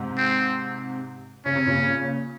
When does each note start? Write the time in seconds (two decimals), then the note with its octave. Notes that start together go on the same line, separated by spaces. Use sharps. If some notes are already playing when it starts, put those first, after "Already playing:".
Already playing: G#2 C3
0.17 C4
1.46 C#3 C#4
1.55 C3
1.66 A#2 C#3